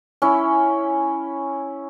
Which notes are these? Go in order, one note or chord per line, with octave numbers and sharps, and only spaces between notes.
C#4 E4